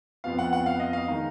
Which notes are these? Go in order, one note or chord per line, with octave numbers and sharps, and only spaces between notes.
F2 F3 B3 F5
F#5
F#5
F5
D#5
F5
D#3 G#3 D#4